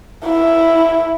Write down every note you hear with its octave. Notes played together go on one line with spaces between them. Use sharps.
E4